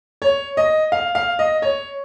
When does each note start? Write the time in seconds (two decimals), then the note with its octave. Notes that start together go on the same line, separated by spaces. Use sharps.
0.22 C#5
0.57 D#5
0.92 F5
1.15 F5
1.39 D#5
1.62 C#5